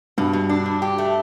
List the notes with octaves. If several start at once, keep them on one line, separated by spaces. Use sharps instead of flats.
G2 B2
B2
D4
B2
G4
A3